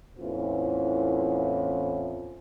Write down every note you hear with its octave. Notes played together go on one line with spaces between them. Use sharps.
E2 A2 E3 C4 C#4 F4